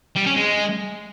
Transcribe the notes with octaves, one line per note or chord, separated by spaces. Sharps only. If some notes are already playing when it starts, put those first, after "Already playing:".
G3
C#4
G#3